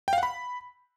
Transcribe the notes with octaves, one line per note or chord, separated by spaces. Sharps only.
G5
F5
F#5
B5